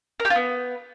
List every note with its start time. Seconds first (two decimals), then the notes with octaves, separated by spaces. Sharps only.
0.20 A#4
0.25 G4
0.30 F4
0.36 B3